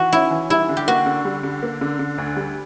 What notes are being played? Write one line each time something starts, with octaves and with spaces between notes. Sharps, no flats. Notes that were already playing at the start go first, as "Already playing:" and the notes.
Already playing: E3 F#4
C#4 E4
E3
G3 E4
D3
G4
A#3 F#4
D3
G3
D3
A#3
D3
D3
D2
G3